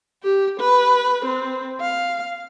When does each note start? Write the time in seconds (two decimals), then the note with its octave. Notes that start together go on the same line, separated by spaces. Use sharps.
0.23 G4
0.60 B4
1.26 C4
1.81 F5